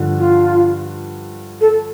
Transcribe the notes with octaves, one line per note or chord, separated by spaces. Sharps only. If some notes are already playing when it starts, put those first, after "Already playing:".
Already playing: G2 D3 F3
F4
A4